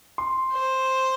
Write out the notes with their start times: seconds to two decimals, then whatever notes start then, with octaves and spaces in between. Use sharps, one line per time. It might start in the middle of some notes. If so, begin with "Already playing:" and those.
0.18 C6
0.53 C5